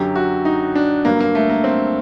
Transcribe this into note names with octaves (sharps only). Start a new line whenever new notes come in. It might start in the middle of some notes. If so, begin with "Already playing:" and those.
Already playing: F#2 D3 F#3 G4
F#4
D#4
D4
G2 D3 F#3 A#3
A#3
A3
A#3
C4